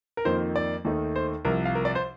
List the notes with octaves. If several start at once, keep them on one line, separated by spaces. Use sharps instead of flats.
A#4
F2 D#3 A#3 C5
D5
D#2 D#3 A3 D#4
C5
C2 C3 F3 A#4
F5
A#4
D5
C5